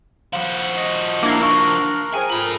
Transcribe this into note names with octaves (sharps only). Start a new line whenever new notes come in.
F3 F#4 F5 B5
D#5
A#3 D4 E4
D4 D#4 A#4 C#6 E6
G#4 C5 G5 G#5
F4 A4 B5